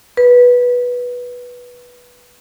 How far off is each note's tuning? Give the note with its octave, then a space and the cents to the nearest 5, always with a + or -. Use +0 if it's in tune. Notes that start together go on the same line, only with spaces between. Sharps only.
B4 -10